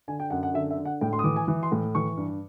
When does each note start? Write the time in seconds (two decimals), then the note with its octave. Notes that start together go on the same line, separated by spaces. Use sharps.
0.08 D3 G#5
0.20 G5
0.30 F#2 F#5
0.43 F#5
0.54 D3 E5
0.71 E5
0.78 D3
0.85 F#5
1.01 A2 G5
1.13 C6
1.19 D#6
1.24 E3 D6
1.36 G#5
1.48 E3
1.63 C6
1.72 A2
1.95 E3 C#6
2.17 G2